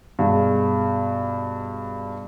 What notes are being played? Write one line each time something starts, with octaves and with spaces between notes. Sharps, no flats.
G2 B2 G#3